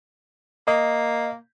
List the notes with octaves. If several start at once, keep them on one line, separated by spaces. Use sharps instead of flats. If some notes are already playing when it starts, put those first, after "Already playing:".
A#3 D#5